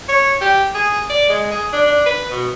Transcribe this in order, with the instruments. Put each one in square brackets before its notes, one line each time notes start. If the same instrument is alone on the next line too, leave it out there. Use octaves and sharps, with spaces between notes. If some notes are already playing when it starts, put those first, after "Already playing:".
[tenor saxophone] C#5
G4
G#4
D5
G#3
G#4
D4
D4
B4
B2